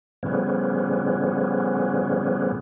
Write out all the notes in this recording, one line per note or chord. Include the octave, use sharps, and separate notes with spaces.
A2 C#3 F3 G3 B3 C#4